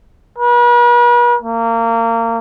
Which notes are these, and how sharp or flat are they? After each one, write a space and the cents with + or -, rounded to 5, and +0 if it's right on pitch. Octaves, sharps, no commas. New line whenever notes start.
B4 -45
A#3 -25